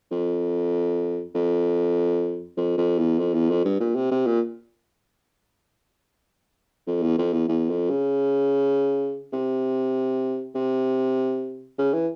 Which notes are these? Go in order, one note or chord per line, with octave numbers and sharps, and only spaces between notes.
F2
F2
F2
F2
E2
F2
E2
F2
G2
A#2
C3
C3
A#2
F2
E2
F2
E2
E2
F2
C#3
C3
C3
C#3
E3